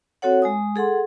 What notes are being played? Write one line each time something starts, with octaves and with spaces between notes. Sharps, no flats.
C4 F#4 A4 C#5 F#5
G#3 G#5 D#6
G#4 A4 F#5 C6